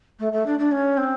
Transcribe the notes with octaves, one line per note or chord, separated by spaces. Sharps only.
A3
A3
D4
D4
C#4
C4